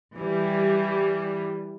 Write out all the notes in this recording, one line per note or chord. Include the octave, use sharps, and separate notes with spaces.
E3 G3